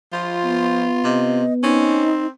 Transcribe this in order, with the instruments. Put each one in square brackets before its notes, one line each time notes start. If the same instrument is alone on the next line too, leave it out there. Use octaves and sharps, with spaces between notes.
[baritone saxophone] F3 [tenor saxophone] F4
[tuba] B3
[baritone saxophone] C3 [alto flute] D#5
[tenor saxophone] C4 [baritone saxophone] C#4 [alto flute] D#4